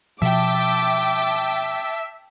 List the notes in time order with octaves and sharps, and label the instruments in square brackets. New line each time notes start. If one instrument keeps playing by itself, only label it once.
[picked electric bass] B2 F3 [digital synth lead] E5 [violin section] G5 A5 [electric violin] D6